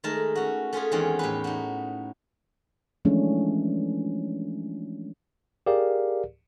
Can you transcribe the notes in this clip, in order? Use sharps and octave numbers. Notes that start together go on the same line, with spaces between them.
D#3 G#3 A3 A#4 A5
C#4 F#4
A3 C#4 F4 G#4
E2 D#3 G#3 C4 C#4 F#5
A2 G4 B4
D#4 F#4
E3 F3 G#3 A3 C#4 D4
G4 G#4 A#4 D5 F5